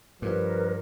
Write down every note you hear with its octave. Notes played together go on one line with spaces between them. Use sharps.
G2 F3 A#4 B4